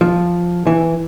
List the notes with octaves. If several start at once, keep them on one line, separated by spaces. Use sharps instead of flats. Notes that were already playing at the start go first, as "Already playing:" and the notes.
F3
E3